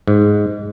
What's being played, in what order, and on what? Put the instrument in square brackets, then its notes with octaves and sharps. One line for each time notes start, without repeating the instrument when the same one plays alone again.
[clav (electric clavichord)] G#2